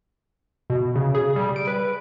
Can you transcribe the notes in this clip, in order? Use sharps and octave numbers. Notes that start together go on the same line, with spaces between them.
B2
C#3
G#4
G3
D7
B4